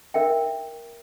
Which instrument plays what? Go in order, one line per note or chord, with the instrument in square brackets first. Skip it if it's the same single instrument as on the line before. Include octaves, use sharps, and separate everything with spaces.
[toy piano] D#4 A#4 E5 G5